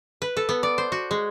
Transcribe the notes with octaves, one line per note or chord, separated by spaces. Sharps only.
B4
A4
B3
D5
C5
F#4
G#3